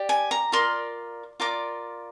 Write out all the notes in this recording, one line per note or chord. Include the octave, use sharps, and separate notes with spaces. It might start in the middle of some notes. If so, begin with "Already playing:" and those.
Already playing: G4 D5
G#5
A#5
F4 A#4 D5 C6
F4 A#4 D5 D6